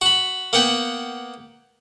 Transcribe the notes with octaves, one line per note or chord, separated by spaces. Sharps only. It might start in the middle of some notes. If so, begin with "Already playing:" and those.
F#4 B5
A#3 B3 F#5 G5